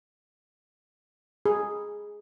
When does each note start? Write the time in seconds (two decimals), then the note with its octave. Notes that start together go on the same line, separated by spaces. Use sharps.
1.46 G#4